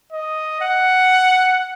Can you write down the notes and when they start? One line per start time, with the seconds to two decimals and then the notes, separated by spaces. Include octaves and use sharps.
0.12 D#5
0.61 F#5